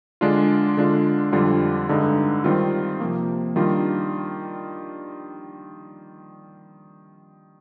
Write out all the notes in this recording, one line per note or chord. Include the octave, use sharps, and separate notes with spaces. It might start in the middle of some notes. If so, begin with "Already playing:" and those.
D3 G#3 D4 F4
D3 G#3 D4 F4
F2 D3 G3 D4 F4
G2 D3 G#3 D#4
D#3 G3 C4 F4
C3 F3 A#3
D#3 G3 D4 F4